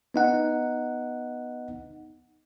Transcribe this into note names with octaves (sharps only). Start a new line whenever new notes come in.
B3 D#4 F#5